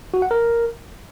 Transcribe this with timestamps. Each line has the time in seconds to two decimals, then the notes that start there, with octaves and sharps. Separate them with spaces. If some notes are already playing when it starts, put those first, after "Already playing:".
0.14 F#4
0.22 F#5
0.31 A#4